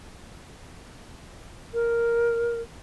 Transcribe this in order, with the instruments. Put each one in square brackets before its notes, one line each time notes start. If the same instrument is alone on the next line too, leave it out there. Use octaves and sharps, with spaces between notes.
[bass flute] A#4